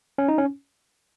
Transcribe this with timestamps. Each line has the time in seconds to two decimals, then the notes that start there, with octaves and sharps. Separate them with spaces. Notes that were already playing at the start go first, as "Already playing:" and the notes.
0.18 C#4
0.28 D#4
0.38 C#4